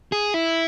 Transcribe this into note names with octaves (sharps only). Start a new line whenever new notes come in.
G#4
E4